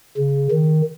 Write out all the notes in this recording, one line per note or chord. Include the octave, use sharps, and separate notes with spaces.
C#3
D#3